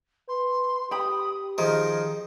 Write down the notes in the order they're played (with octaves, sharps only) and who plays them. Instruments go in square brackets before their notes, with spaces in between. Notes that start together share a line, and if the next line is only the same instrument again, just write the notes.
[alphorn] B4 [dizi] C6
[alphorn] G4 [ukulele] G5 B5 [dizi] D#6
[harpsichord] D#3 F3 [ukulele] G#4 [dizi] D#5